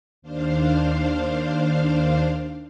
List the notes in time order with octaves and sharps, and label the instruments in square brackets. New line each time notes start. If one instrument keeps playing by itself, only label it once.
[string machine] D#2 D4 C5 F5